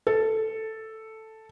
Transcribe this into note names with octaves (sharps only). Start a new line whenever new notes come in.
A4